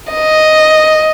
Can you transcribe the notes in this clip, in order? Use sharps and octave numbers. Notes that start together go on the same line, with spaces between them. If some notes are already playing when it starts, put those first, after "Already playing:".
D#5